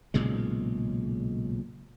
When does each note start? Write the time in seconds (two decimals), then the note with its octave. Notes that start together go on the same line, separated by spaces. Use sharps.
0.14 B1 A#2 C#3 G#3